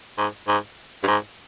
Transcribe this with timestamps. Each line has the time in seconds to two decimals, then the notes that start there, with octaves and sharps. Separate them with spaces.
0.18 G#2
0.48 G#2
1.03 G2
1.07 G#2